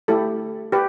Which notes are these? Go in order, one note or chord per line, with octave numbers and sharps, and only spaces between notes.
A3 E4 G4 A4
G4 B4